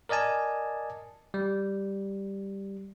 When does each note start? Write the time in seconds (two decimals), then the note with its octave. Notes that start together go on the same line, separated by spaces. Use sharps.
0.09 A#4 D5 D#5 G#5 A5
1.34 G3